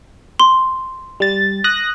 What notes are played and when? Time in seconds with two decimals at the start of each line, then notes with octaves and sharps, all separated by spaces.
0.40 C6
1.20 G3 A6
1.64 D#6 F#6 A#6